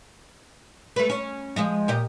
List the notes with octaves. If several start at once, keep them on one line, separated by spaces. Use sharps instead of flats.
A3 B4
C#4
F3 G#3 D#5
A#2 G4 D#5